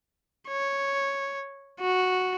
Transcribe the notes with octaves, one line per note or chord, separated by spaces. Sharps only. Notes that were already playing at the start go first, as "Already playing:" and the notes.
C#5
F#4